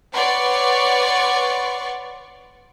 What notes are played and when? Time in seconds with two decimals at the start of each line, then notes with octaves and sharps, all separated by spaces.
0.13 B4 C#5 D5 F#5 C6 C#6